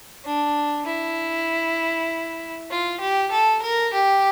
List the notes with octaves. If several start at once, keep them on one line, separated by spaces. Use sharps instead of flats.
D4
E4
F4
G4
A4
A#4
G4